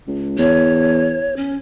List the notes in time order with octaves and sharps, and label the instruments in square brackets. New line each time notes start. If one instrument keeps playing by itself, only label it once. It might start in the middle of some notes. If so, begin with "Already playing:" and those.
[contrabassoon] C#2
[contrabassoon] E2 [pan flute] C#5
[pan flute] C#4